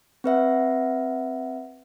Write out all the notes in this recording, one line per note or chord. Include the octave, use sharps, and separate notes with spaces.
C4 B4 E5 F#5